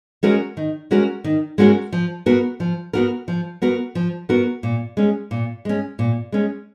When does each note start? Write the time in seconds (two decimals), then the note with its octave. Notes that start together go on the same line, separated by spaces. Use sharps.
0.23 G#3 C#4 F#4 A#4
0.57 D#3
0.91 G#3 C#4 F#4 A#4
1.24 D#3
1.58 G#3 C#4 F#4 A#4
1.92 F3
2.26 B3 F#4 A#4
2.60 F3
2.93 B3 F#4 A#4
3.28 F3
3.62 B3 F#4 A#4
3.95 F3
4.29 B3 F#4 A#4
4.63 A#2
4.97 G#3 C#4
5.31 A#2
5.65 G#3 C#4
5.99 A#2
6.32 G#3 C#4